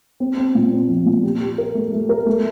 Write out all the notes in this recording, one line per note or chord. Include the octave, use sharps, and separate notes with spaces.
C4
C4
A#2
C4
F3
A#2
G4
G4
A#4
A3
A3
A#4
A3